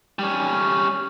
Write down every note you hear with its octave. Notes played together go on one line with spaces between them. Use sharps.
G3 C#4